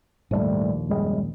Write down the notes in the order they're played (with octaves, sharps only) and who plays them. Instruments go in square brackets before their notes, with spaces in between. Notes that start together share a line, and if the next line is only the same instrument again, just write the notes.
[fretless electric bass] A#1 D#2 [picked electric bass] G#2 G3 A3
[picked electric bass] F#2 G3 G#3